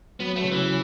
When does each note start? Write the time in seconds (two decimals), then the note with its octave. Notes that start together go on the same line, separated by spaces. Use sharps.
0.20 F#3 B3
0.36 A3
0.44 C#3
0.52 E3